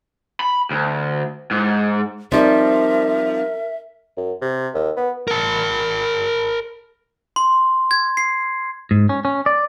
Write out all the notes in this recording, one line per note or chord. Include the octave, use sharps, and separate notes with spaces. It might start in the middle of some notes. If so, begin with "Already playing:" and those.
B5
D2
G#2
F3 G3 C4 D#4 A#4 C5 E5
F#2
C3
D#2
B3
A#4 A5
C6
G#6
C7
G#2
C#4
C#4
D5